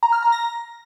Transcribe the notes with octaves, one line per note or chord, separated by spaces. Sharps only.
A#5
F6
A#5
A#6